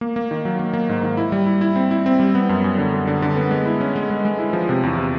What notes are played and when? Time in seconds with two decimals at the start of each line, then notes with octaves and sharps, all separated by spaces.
0.01 A#3
0.16 A#3
0.31 D#3
0.45 F#3
0.59 A#3
0.73 A#3
0.89 G#2
1.03 D#3
1.17 E4
1.32 G3
1.46 E4
1.61 E4
1.76 C4
1.91 E4
2.06 C4
2.19 G3
2.35 B3
2.49 F#2
2.64 F#2
2.78 D3
2.94 F#2
3.07 D3
3.22 D3
3.37 B3
3.51 G#3
3.66 E4
3.81 C#4
3.96 G#3
4.10 G#3
4.25 G#3
4.39 E4
4.53 F3
4.69 C3
4.83 E2
4.98 C3